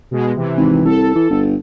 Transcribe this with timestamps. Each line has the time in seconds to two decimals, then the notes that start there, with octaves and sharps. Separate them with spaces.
0.11 B2 G#3
0.35 C3 E3
0.57 G#1
0.85 C2 A4
1.15 E3
1.30 G1